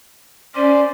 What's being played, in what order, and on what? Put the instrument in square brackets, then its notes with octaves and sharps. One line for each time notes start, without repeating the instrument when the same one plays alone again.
[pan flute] C#4 [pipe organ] C5 D5